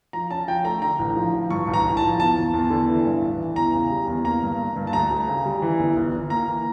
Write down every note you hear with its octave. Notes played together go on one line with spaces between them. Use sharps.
F3 A#5
C#4 A5
F3 G5
A3 A#5
D3 A#5
A1
F3
F3
G2 C#6
A1
A#5
A1
A5
F3
E2 A5
E2
E2
D3
E3
G2
A1
E3
E2 A#5
C#3
G3
E2
A#3 A#5
G2
A#3
G2
A5
D2 A#5
D2
C#3
G3
E3
G1
G1
G1
A#3 A#5
E3